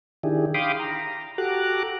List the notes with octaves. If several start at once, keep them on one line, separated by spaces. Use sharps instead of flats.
D#3 D4 E4 G4 G#4
F5 G5 B5 C6 D6 D#6
A#5
F#4 G4 A4 A#5 D6 F#6